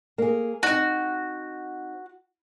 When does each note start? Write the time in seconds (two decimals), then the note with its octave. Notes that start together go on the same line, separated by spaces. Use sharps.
0.18 A#3 G#4
0.63 C4 D#4 F#4